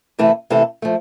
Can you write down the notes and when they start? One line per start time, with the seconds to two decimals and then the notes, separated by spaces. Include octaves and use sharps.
0.19 C3 E3 A3 E4 A4
0.50 C3 E3 A3 E4 A4
0.82 F3 A3